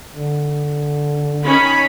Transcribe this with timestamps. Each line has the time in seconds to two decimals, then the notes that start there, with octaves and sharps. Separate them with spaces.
0.14 D3
1.43 D#3 C#4 B5